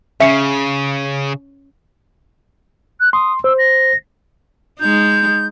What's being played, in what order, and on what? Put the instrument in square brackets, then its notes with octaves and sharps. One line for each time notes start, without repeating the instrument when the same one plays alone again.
[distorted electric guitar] C#3 [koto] C#4 C#5 [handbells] E5 C#7
[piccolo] F#6
[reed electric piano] C6 [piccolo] D#6
[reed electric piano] C5 [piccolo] E6
[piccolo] A#6
[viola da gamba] G#3 D#4 [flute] G6